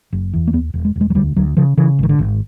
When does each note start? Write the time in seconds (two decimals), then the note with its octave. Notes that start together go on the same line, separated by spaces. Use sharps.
0.12 F#1
0.33 E2
0.47 A#3
0.53 D#2 B3
0.74 E1
0.85 G#3
0.96 E1
1.01 G#3
1.10 F#3
1.15 D2 G3
1.36 D2 F#3
1.57 C#3 F3
1.77 C#3 E3
1.99 G#1 D#3
2.09 D3
2.19 G#1